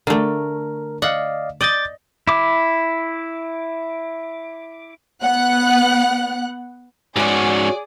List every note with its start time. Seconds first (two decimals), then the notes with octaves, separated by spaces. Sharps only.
0.07 D3 A3 A#4
1.02 D5 D#5 F5 F#5
1.61 D5 D#5 D6 G6 A6
2.27 E4 D6
5.22 B3 F#5 F#6
7.16 G#2 C#4 F#4 G#4 D5 F#5